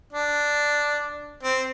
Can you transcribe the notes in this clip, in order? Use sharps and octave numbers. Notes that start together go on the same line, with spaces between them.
D4
C4